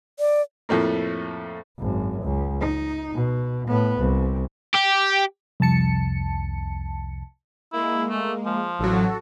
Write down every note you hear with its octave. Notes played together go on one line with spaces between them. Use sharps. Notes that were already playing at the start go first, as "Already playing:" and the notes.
D5
F2 A2 A3 A#3
G#1 F#2
C#2
D#4
B2
A2 B3
C2
G4
C2 F2 A5 C#7
G#3 A#3 E4
A3
F3
A1 F#3 F#4 A4